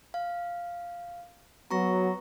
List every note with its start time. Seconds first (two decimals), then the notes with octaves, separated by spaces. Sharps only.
0.14 F5
1.71 F#3 B3 F#4 A#5 C#6 A#6